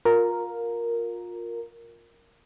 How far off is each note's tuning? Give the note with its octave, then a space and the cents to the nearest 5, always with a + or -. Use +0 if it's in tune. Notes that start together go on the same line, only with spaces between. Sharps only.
F4 +25 A#4 +0